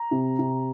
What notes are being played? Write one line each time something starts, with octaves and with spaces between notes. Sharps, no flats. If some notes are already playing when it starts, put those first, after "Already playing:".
Already playing: A#5
C3
C3